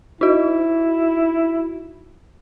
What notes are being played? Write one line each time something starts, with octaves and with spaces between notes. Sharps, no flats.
D#4 E4 F#4